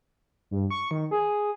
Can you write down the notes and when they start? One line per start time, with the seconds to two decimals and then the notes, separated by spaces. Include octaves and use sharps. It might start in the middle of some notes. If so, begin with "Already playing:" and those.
0.51 G2
0.71 C#6
0.91 D#3
1.11 G#4